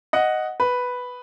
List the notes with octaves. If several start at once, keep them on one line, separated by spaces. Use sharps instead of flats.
D#5 F#5
B4